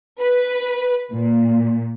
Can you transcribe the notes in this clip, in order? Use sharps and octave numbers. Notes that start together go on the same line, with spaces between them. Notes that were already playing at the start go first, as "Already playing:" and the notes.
B4
A#2